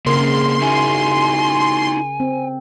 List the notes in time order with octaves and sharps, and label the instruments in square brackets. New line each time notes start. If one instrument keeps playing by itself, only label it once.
[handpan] C#3 A#4 [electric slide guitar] A#3 C4 G#4 [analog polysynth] C6
[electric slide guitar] D#4 E4 F#4 [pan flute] G#5
[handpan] C4